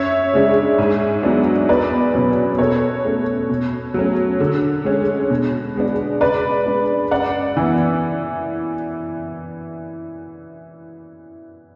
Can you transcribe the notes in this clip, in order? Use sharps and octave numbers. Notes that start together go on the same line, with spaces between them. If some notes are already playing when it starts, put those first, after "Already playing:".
Already playing: F#2 C#5 E5
C#3 G#3 D4
G#2
F#3 B3 D4
E2 B4 D5
B2 F#3 C#4
B2 A4 C#5
A3 C#4
B2
F#3 A3 C#4
D3
G#3 C#4
B2
G#3 B3 D4
C#3 B4 D5
G#3 D4
F#2 D5 F#5
E3 B3